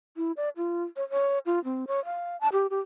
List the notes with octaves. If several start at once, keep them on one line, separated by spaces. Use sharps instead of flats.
E4
D5
F4
C#5
C#5
F4
C4
C#5
F5
A5
G4
G4